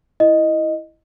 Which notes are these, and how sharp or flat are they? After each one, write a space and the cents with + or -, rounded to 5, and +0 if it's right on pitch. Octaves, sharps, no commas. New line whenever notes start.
E4 +0 D#5 +0